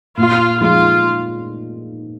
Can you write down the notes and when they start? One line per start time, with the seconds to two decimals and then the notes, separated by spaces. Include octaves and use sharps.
0.17 A#2 F4
0.61 F3 G#3 D#4 F4